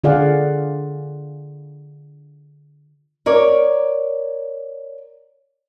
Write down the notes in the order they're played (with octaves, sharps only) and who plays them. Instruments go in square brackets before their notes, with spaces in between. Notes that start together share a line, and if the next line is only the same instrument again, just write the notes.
[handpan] D3 F4 G#4 D5 F5 F#5
[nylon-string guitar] A#4 C#5 D5